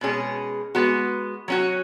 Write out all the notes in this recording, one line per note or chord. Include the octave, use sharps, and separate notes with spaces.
B2 G#3 C#4 G#4
G#3 B3 F#4
F#3 C#4 F#4